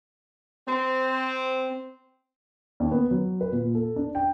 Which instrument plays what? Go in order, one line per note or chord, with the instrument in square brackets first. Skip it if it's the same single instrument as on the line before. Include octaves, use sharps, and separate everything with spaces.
[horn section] C4
[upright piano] D#2
B3
F#3
B4
A#2
A4
D4
G5